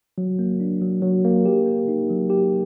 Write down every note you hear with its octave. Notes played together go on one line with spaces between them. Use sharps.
F#3
A#3
D4
F#3
F#3
A#3
G4
A#3
D#4
F#3
G4